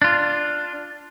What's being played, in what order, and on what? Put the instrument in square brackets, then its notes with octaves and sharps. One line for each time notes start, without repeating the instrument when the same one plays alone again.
[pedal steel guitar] D4 F4